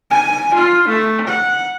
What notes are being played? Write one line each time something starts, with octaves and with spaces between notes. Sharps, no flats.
G#5
F4
A3
F#5